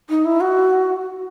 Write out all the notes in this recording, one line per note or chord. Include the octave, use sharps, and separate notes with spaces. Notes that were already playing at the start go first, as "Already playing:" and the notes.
D#4
E4
F#4